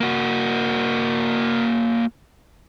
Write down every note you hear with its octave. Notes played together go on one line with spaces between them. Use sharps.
A#3 F#4